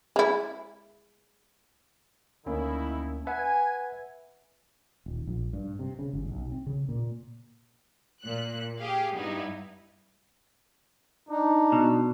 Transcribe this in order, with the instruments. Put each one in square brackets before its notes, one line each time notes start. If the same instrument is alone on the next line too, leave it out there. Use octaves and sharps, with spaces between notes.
[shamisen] G#3 E4
[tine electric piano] D2 A#3 C#4 [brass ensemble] D#3 D#4 E4
[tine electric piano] B4 E5 F#5 [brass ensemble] G#5
[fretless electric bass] D#1
A#1
G2
C3
C#3
G1
B1
C4
C#3
A#2
[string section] A#2 F#6
G4 G#4 F5
G2 B3 D#4 E4
[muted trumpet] D4 [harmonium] D#4
[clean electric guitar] B2